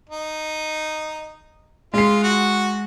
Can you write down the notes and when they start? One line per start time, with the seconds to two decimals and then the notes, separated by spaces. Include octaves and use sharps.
0.09 D#4
1.94 G#3 F4 C7
2.23 F#4 F#5